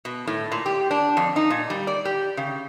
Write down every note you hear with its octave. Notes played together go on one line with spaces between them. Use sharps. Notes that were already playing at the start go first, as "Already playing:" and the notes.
B2
A2
A#2
G4
D4
F2
D#4
A#2
G3
D5
G4
C#3